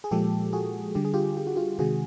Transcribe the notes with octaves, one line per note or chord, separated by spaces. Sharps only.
G#4
A#2 F3 G#3 G4 A4
F#4 G#4
D3 G3 G4
G#4
F4 G4
G4
F#4
F4 G4
C3 D#3 G#3 F#4 G#4